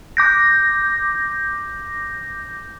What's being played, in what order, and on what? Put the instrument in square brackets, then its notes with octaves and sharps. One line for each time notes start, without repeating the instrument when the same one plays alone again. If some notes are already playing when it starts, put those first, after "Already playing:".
[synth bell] D6 G6 A#6